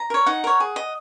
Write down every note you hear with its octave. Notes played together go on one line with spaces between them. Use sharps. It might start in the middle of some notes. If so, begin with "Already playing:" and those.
Already playing: A#5
A#4 C#5
D#4 F#5
A#4 C#5
G#4
D#5